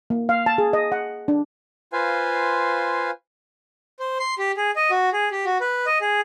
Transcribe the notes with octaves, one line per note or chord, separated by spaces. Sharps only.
A#3
F5
A5
G#4
D#5
F#5
D4
F4 B4 C5 F5 G#5
C5
C6
G4
G#4
D#5
F#4
G#4
G4
F#4
B4
D#5
G#4